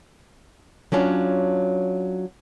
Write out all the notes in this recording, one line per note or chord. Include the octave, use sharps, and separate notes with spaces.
F#3 C#4 D4 F4